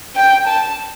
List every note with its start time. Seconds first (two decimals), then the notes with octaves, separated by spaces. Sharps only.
0.16 G5
0.47 A5